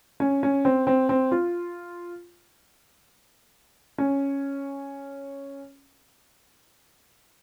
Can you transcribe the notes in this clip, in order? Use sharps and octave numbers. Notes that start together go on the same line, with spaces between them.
C#4
C#4
C4
C4
C4
F4
C#4